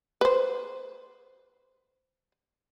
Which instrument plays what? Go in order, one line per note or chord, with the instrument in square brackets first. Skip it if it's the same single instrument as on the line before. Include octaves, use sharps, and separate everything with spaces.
[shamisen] B4 C5